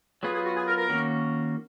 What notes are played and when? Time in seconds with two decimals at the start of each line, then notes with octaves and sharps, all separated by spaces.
0.23 F#3 B3 F4 G#4 B4
0.34 G#4
0.45 F#4
0.56 G#4
0.68 A#4
0.78 A#4
0.89 D#3 A#3 C#4 F#4